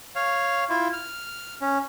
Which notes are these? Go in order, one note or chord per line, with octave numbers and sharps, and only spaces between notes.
C#5 F5
E4 F4
F6
C#4